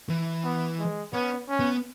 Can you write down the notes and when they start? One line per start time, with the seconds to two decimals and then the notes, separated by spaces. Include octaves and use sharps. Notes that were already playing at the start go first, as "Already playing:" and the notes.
0.10 E3
0.44 B3
0.79 G#3
1.13 B3 C#4
1.48 C#4
1.60 B3